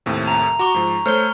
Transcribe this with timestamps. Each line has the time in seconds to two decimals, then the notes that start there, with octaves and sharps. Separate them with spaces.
0.06 D#2 A2 C3
0.27 A#5 F7
0.59 F#4 A#5 C#6 D6 F7
0.74 G#2 F3
1.06 A3 C5 C#5 F6 G7